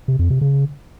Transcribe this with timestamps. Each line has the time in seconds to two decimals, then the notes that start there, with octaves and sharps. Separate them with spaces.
0.08 C3
0.19 F2
0.30 C3
0.41 C#3